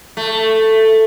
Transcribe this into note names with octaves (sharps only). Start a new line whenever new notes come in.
A3